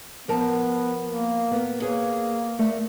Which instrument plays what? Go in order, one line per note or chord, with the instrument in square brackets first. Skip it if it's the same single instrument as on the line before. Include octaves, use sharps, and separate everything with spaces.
[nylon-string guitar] F3 A#4 A5 [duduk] B3
[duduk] A#3
[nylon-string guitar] B3 A#4
[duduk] A#3 [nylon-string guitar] G#4 B4 C#5
[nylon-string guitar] A3 A#4 D5